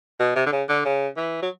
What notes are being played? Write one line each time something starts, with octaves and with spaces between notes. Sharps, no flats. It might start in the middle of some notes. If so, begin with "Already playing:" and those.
B2
C3
D3
C#3
D3
C#3
E3
F#3